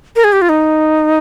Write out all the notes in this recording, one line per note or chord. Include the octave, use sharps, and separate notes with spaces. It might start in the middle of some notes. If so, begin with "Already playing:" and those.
A#4
G#4
G4
F4
D#4